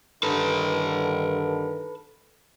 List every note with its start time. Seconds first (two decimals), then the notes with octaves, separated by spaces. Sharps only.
0.23 G2 D3 D#3 A4 B4